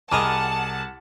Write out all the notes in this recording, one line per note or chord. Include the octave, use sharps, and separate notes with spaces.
C2 G#4 A#4 D#5 F#5 A5 B5 D6